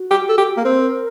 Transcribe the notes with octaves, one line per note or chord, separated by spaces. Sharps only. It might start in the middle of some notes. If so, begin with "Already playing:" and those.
Already playing: F#4
G4
A4
G4
A#3
C4 A#4